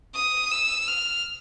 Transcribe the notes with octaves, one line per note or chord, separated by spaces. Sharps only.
D#6
E6
F6